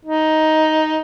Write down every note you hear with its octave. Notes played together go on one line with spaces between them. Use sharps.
D#4